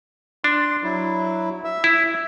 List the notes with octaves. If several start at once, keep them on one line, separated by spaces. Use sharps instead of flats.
D4 C6
F#3 E4
E5 E6
E4